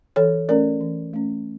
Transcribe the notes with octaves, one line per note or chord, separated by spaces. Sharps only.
E3 A4 C#5
A3 C#4 A#4 D5
E3
A3 C#4